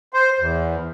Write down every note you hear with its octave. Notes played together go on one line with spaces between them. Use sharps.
C5
E2